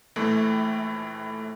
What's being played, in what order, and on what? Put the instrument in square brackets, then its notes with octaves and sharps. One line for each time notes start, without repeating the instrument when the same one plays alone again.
[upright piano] A#1 A2 E3 A3